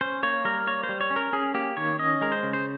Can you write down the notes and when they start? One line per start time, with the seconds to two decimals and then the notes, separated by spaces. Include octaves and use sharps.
0.01 C#4 C5
0.23 A#3 C#5
0.45 G3 A#4
0.67 A#3 C#5
0.83 C5
0.89 G3
1.01 C#5
1.10 C#4
1.16 A#4
1.33 C#4 G#4
1.54 A#3 G4
1.77 D#3 C#5
1.99 C#4 D#5
2.21 G#3 A#4
2.32 C5
2.43 C#3
2.53 C5